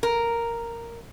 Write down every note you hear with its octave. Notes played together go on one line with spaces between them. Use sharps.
A#4